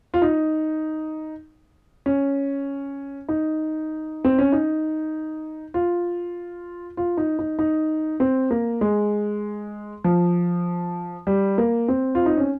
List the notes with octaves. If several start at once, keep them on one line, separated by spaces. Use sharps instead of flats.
F4
D#4
C#4
D#4
C4
C#4
D#4
F4
F4
D#4
D#4
D#4
C4
A#3
G#3
F3
G3
A#3
C4
F4
D#4
C#4